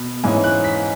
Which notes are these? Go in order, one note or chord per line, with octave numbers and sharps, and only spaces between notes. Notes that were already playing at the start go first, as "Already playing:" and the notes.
Already playing: B2
G#2 E3 C#4 G#5
F#6
B6